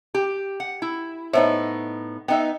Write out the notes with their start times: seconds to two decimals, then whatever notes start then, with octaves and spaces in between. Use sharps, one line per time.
0.15 G4
0.60 F#5
0.82 E4
1.33 A2 B3 D#4 C5 C#5 E5
2.28 B3 D#4 E5 G5